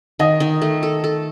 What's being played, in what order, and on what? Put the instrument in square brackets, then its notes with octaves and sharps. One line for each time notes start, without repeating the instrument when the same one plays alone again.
[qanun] D#3 [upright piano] D#5
[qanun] D#3
A3
A4
A4